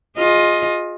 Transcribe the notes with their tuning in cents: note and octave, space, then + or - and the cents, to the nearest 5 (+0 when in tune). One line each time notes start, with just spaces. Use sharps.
F4 +20 G#4 +0 D#5 +5